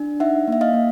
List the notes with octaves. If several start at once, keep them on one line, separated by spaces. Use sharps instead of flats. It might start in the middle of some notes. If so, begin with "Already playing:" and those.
Already playing: D4
D#4 E5 F#5
A#3 E5
D#5 F5
A#3